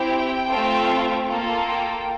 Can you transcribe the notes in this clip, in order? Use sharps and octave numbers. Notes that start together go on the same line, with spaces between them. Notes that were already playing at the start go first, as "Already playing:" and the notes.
Already playing: C4 E4 G4 G5
A3 C4 F4 A4
A#3 F4 A4 A5
G5